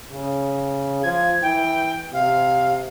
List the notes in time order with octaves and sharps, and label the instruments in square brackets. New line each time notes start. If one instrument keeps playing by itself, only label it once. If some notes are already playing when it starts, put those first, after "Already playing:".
[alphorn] C#3
[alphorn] F3 [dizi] G#6
[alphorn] E3 [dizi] G5
[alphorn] C3 [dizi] F5